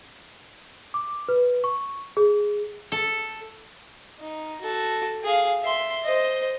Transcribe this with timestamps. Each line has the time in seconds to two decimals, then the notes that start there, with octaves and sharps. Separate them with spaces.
0.94 D6
1.29 B4
1.64 C#6
2.17 G#4
2.92 A4
4.20 D#4
4.61 F#4 A4
5.24 G#4 F5
5.62 E5 C6
6.04 C5 D#5